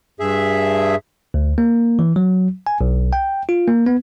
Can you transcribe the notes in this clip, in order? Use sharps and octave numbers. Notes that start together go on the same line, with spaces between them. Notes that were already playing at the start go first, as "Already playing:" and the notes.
G2 G#4 E5
D2
A#3
E3
F#3
G#5
B1
G5
F4
A#3
B3